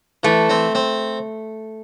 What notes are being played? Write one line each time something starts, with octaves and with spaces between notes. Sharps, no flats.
E3 A3
C4
C4